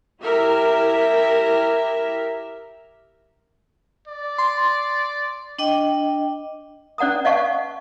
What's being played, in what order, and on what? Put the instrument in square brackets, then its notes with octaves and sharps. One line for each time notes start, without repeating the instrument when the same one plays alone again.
[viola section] E4 G4 A#4 E5
[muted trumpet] D5
[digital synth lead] C6
[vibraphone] D4 D#5 G5
[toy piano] C#4 D5 F#5 A#5 D#6
D5 D#5 F5 F#5 A5 C#6